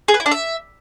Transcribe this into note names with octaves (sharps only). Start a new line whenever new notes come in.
G#4
B4
E4
D4
E5